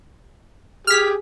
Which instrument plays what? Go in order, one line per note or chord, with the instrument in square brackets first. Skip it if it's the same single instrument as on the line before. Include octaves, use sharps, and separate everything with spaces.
[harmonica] G4 G#4 [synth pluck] F6 B6